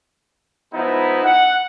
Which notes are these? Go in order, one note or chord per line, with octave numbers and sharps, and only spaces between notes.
F3 G#3 B3 D#4 E4
F#5